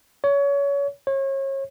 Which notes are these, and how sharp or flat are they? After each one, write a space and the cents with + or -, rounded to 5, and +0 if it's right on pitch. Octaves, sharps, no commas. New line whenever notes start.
C#5 +25
C#5 -35